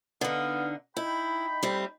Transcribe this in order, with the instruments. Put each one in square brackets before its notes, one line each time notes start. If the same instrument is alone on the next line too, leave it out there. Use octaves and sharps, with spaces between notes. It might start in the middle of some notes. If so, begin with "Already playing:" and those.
[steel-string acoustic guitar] D3 D#4 [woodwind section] B3 F5
[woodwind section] D#4 G5 B5 [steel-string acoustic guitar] E4
[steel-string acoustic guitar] G3 A3 C4